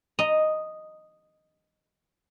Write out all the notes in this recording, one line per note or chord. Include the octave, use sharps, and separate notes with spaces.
D#5 A#5